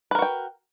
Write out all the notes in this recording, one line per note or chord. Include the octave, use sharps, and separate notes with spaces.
F#4 A#4 B4 G5